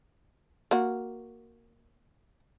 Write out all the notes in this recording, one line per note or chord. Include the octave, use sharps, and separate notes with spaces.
A#3 F#4